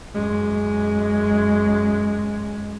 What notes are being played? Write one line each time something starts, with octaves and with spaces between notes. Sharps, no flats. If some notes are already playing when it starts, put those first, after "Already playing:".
F#2 G#3